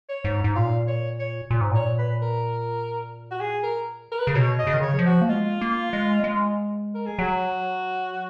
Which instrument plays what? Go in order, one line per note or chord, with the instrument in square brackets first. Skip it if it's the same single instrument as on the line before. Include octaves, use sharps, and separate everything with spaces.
[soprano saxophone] C#5
[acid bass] G#2
G#2
[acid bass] A#2 [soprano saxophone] F5
[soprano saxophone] C#5
C#5
[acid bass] A#2
G#2
[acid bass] A#2 [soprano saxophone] C#5
[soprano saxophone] B4
A#4
F#4
G#4
A#4
A#4
B4
[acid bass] C#3 [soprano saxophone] A#4
[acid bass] B2 [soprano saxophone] C#5
[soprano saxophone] D#5
[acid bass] C#3
D#3
[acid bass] C#3 [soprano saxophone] C#5
[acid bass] F#3
F3
[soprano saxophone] F#4
[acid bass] A#3
[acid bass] G#3 [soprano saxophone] F4
[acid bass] A#3
G#3
G#3
[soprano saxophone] A#4
G#4
[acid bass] F#3 [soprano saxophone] F#4